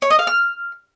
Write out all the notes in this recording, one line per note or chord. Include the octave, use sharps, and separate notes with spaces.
C#5
D#5
F5
F6